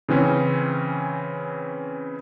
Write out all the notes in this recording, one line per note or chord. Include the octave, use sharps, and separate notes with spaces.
C#3 E3 C4 C#4